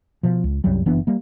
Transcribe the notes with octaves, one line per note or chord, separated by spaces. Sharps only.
B2 F3
C#2
C2 F#2 F#3 G3
F#1 E3 B3 D4
G3 A#3